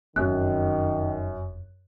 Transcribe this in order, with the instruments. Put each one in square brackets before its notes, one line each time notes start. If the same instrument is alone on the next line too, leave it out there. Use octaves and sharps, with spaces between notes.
[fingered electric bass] F1 [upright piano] F#2 [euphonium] D#3 [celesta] F#6